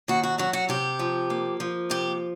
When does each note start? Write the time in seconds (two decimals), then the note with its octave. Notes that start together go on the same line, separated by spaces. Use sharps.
0.08 D#2 F#4
0.23 F#4
0.38 F#3 F#4
0.53 F#4
0.69 C3 G4
0.99 F3
1.30 A#3
1.60 F3
1.90 C3 G4